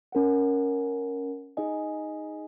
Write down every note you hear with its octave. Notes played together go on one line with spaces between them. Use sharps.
C#4 A#4 F#5
D#4 G#4 D#5 G#5